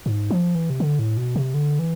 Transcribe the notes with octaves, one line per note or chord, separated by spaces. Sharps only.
G#2
F3
E3
C3
D3
A2
B2
C3
D3
E3